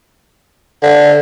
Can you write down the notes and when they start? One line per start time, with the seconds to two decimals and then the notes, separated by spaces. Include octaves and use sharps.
0.83 D3